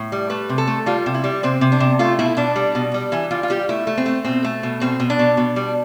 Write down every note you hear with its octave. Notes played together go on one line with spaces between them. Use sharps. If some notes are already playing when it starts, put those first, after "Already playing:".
Already playing: A2
G3
A3 B4
C3
A4
A3
G3 F4
C3
E4
G3
C3 C4
C3
D4
C3
A3 F4
B2 E4
B2 D4
G3
B2
G3
E3 E4
G3 F4
F4
G3 G4
A3 E4
A3
C4
A3
B2 C4
A3
B2
B2 C4
B2
D4
B2
B2
G3